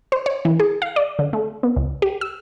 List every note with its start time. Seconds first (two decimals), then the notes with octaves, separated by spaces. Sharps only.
0.12 C5
0.26 C#5
0.45 E3
0.60 G#4
0.82 F5
0.96 D5
1.19 D3
1.33 A3
1.63 B3
1.76 C#2
2.02 G4
2.21 E6